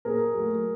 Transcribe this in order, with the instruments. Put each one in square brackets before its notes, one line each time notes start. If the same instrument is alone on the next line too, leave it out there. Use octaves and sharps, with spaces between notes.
[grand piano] A#2 G#4 A#4
F#3 A3